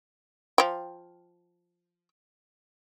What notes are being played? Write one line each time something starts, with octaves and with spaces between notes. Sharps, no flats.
F3 G5